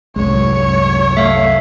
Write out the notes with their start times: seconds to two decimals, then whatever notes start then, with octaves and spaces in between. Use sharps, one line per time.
0.16 C2 F#2 A2 G#3 C#5
1.17 A3 E5 F5